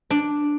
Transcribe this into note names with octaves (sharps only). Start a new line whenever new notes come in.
D4